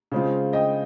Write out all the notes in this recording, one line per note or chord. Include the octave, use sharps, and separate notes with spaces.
C#3 G#3 C4 F4
D#5 G5